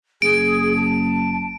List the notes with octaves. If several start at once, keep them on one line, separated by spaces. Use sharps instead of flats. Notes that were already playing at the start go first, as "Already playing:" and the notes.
F#1 G#4 D7
A5